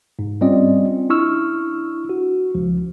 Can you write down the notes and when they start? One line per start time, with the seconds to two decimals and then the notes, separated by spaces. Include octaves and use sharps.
0.19 G#2
0.41 G3 C4 C#4 F4 D5 D#5
1.10 D4 E4 C#6 E6 F6
2.09 F#4
2.55 C#2 F3